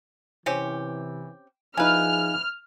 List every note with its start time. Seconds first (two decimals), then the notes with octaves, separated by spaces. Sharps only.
0.46 C3 E3 C4 C#4 G4
1.77 F3 D#4 E4 G#4 B4 F5 G#5 F6